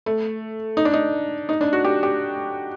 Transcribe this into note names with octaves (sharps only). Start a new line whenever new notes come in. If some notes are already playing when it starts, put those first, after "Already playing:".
A3
D#4
D4
D#4
D#4
D4
F#4
G4
G4